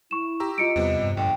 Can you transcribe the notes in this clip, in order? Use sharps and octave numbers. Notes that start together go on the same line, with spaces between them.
E4 C#6 E7
G4 A#5 E6
F4 D#5 C#7 D7
E2 C3 G3 B3
G2
A#1 G2 D3 G5